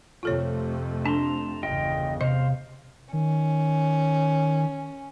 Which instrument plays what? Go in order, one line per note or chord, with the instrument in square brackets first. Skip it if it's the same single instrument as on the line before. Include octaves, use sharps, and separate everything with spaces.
[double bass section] F2 C3 A3 [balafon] F4 A4 C#5
[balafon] D4 [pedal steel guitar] A5 A#5 C6
[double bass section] G1 E2 C#3 [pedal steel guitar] F4 D#5 G5
[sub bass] C3 [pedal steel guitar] C5 F5 [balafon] D#5
[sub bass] D#3 [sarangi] C#4